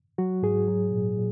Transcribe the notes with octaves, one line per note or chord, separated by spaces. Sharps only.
F#3 F#4
G#2 G#4
F#3
A#2
A#2